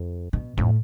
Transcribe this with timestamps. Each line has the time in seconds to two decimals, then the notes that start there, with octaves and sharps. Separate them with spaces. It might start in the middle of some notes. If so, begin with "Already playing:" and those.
Already playing: F2
0.33 B2
0.57 F2 A2